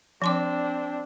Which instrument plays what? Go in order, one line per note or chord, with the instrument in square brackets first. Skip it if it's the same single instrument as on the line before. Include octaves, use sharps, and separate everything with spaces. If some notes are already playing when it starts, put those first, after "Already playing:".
[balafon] F3 C6 D6 [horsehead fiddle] C4 D4